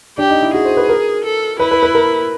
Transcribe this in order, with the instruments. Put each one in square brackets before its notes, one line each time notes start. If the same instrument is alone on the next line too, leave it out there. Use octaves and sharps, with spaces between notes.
[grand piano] D4 [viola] G4
[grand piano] D#4
E4
[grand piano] F#4 [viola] G#4
[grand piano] C5
B4
A#4
[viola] A4
[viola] E4 [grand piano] B4
[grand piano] B4
B4
A#4